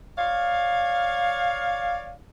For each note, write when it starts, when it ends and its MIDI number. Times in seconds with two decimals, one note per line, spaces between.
0.18 2.14 73
0.18 2.14 74
0.18 2.14 77